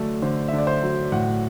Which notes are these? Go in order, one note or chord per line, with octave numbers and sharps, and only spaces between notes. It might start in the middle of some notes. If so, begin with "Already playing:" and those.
Already playing: D3 F#3 A3 D5
D3 C5
E5
D3
D5
C5
F#3
A2 F#5